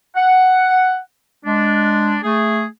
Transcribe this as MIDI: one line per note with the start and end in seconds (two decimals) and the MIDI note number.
0.16 1.00 78
1.45 2.17 56
1.45 2.17 62
2.23 2.65 57
2.23 2.65 68